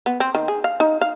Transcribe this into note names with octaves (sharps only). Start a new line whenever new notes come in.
B3
C4
D#3
G#4
F5
D#4
F5